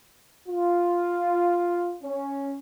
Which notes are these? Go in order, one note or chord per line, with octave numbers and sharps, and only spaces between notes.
F4
C#4